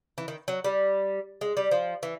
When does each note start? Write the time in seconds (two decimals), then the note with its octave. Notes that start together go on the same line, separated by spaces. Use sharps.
0.18 E3
0.28 D#3
0.48 F#3
0.64 G3
1.41 G#3
1.57 G3
1.71 F3
2.03 E3